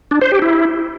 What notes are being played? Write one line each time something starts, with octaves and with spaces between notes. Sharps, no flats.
D4
C5
G4
E4